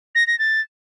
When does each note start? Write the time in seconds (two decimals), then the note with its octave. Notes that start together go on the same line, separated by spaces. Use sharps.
0.15 A#6
0.27 A#6
0.39 A6